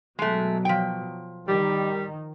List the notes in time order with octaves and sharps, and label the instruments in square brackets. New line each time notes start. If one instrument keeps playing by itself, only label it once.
[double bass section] B2 F#3 [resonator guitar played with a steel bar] G#3 A3
[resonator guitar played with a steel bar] F3 G5
[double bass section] D#3 [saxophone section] G3